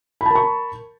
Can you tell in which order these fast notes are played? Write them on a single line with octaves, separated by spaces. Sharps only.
B5 A5 A#4 C#6